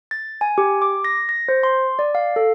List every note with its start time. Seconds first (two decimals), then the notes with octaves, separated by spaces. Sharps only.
0.11 A6
0.41 G#5
0.58 G4
0.82 D6
1.05 A#6
1.29 A#6
1.48 C5
1.63 C6
1.99 D5
2.15 F5
2.36 A4